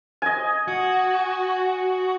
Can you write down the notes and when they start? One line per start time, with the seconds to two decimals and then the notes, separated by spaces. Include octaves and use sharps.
0.22 D#5 G#5
0.68 F#4